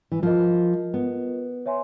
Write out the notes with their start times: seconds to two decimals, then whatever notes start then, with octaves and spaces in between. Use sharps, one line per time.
0.12 E3
0.22 F3 F4 A#4 D#5
0.94 B3
1.66 C#5 E5 G#5 C6